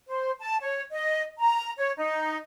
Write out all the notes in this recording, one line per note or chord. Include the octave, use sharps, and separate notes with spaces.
C5
A5
C#5
D#5
A#5
C#5
D#4